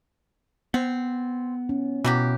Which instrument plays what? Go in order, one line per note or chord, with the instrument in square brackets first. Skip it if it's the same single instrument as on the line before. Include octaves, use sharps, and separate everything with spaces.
[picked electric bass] B3 [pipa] C4
[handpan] C#4
[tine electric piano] B2 [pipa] E3 F#3 G4